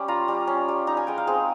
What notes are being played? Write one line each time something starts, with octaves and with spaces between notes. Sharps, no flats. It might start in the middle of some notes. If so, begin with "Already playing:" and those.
Already playing: G3 C#4
F4 A#5
G3
C#4
G3
D#4 A#5
G#5
G#3 G5
F5
C4 G#4